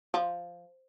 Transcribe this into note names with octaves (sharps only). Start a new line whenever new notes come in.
F3